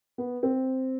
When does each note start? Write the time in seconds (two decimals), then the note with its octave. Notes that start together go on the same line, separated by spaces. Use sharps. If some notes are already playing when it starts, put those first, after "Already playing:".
0.18 B3
0.43 C4